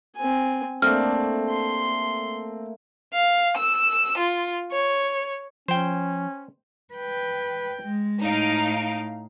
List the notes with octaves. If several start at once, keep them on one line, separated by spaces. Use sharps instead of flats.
C4 G#5
A3 A#3 C4 D4 F6
C6
F5
E6
F4
C#5
F3 C#4 C5 G5
B4 G5
G#3
A2 D#4 F5 D7